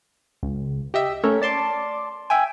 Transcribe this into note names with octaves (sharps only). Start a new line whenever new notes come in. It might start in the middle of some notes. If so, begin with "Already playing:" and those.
C#2
G4 D#5 E5
A3 C#4 A4 A#4 C#5
D5 A5 C6 D6
E5 G5 G#5